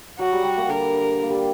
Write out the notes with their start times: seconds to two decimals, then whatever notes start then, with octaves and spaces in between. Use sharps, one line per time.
0.19 F#3 F#4
0.32 G3
0.44 G3
0.57 A#3
0.68 D3 A#4
1.23 A#3
1.30 G3